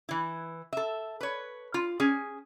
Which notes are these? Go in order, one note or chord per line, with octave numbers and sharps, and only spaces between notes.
E3 E4
A4 E5
B4 C#5
F4
C#4 G#4